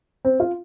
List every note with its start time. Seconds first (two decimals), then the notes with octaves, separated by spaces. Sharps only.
0.25 C4
0.40 F4